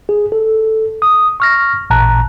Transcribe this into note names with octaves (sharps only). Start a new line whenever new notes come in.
G#4
A4
D#6
C#6 F6 A#6
A1 A#2 A5 A#5 F#6